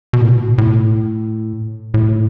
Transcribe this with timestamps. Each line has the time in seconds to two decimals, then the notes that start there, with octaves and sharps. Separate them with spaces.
0.13 B2
0.21 A2
0.29 B2
0.58 A2
1.94 A2